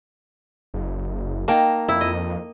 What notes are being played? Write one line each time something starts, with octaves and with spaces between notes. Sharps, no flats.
F#1
A#3 D#4 G5 A5
F2 E4
D#5